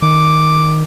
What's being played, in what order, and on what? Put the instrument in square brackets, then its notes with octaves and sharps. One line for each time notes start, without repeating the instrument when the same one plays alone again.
[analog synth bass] D#3 [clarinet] D6